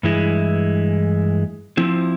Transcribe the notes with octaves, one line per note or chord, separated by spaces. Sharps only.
G2 E3 G#3 E4
F3 C4 E4